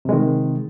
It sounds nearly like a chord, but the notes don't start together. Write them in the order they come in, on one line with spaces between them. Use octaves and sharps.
C3 G#3 D#3